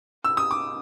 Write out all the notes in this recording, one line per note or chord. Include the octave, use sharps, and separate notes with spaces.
E6
D#6
D6